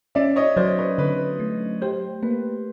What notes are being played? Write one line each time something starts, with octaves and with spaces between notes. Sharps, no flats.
C#4 D5 E5
C#5 D#5
F#3 C5 D5
B4 C#5
D3 B4
A3
G4 C5
A#3 B4